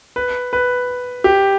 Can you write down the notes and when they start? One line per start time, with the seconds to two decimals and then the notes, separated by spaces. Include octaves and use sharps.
0.16 B4
0.53 B4
1.24 G4